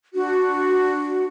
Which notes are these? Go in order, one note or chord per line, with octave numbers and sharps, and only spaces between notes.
D4 F#4